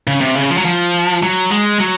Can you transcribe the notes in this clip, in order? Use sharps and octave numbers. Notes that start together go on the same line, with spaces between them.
C#3
C3
C#3
F3
F#3
F3
F#3
G#3
F#3